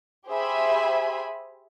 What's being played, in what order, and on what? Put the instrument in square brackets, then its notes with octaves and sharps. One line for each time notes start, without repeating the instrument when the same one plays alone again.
[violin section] G4 G#4 C5 E5 G#5 B5